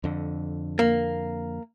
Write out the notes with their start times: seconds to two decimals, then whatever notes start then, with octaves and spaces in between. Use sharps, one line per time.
0.04 F2 D3
0.79 A#3